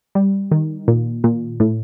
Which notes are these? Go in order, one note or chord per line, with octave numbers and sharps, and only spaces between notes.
G3
D#3
A#2
A#2
A2